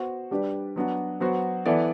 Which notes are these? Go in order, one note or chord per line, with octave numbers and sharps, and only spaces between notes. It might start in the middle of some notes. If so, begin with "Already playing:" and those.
Already playing: B3 F#4 C5
G3 D4 G4 B4 D5
F#3 B3 D4 F#4
F#3 B3 F#4 C5
E3 B3 E4 A4 D5